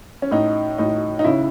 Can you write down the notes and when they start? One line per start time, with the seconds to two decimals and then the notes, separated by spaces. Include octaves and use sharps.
0.22 C#4
0.31 A2 D#4
0.78 A2 D#4
1.19 D#4
1.24 C#3 E4